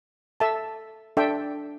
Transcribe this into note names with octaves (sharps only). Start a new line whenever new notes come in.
A4 E5 A5
D4 A4 E5 G5